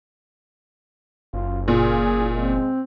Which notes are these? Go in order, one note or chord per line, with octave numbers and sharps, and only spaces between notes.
F#1 F4
A#2 F4 G#4
G#3 C4